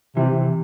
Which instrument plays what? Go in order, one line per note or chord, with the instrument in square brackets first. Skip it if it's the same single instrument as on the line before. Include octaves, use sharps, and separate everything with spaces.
[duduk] C3 [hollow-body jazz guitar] E3